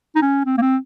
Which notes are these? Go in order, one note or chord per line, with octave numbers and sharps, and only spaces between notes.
D#4
C#4
C4
A#3
C4